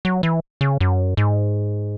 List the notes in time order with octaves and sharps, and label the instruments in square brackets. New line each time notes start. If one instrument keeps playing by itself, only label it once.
[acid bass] F#3
E3
C#3
F#2
G#2